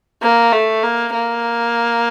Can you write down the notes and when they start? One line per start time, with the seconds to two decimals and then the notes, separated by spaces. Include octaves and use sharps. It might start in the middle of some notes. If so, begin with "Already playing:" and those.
0.22 A#3
0.52 A3
0.83 A#3
1.14 A#3